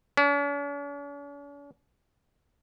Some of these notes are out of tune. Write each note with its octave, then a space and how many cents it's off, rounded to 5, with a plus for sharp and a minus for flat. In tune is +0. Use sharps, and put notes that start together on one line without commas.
C#4 +45